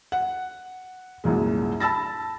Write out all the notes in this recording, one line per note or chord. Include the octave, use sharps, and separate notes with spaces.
F#5
C2 F#2 A#2 G#3
A5 B5 E6 A6 A#6